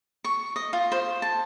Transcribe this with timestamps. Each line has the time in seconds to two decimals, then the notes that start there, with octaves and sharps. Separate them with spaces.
0.24 C#6
0.56 D#5
0.73 F4
0.92 C5
1.22 A5